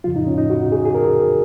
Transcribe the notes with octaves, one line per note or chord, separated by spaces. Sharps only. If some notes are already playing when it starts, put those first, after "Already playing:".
F2 C#3 F3 F4
D#4
C#4
D#4
F#4
G#4
G#4
A#4